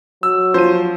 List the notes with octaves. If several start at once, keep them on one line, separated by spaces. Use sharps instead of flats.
F#3 E6
F3 C5 D#7